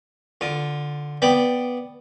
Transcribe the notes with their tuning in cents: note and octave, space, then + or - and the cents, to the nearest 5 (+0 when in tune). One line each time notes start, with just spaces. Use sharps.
D3 +0 F4 +15
B3 +0 D5 +0 G5 +0